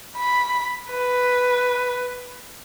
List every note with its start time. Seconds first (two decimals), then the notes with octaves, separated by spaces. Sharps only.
0.17 B5
0.91 B4